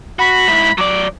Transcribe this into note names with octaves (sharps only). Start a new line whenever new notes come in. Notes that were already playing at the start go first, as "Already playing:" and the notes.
F#4 B5
G#2 E4
F#3 D5 D6